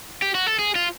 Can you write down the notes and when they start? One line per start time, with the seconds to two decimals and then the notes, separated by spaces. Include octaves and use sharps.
0.22 G4
0.35 F#4
0.47 A4
0.59 G#4
0.75 F4